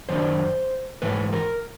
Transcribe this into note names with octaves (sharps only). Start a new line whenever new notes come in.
F#2 D#3 D4 C5
G#2 E3 B4
A#4